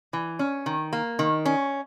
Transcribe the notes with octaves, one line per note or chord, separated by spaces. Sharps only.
E3
C#4
D#3
A#3
D#3
C#4